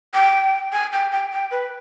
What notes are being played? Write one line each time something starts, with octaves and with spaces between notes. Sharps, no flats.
G5
G#5
G5
G5
G5
B4